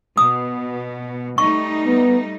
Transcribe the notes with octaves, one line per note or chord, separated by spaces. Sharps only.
B2 D#6
G3 A3 D#4 C#6
B3